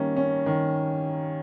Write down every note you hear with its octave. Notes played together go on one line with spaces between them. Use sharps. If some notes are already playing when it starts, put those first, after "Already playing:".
Already playing: D#3 G3 A#3 C#4
C#4
D#3